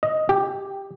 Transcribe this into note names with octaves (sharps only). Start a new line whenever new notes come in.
D#5
G4